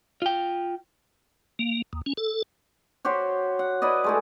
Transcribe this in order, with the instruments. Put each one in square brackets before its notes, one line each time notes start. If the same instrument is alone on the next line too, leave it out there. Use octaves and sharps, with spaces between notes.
[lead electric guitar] F4 G5
[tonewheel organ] A#3
D#2
C#4
A4
[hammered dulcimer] F#4 G4 C5 C#5
F#5
E4 B4 D5 D#5
G#3 A3 E4